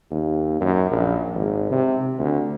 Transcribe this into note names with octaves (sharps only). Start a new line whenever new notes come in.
D#2
F#2
A#1
G#1
C3
D2